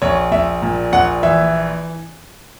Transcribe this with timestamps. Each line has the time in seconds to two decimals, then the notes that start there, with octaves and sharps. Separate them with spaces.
0.02 A#1 C#5
0.32 A#1 E5
0.62 A#2
0.93 A#1 F#5
1.23 E3 E5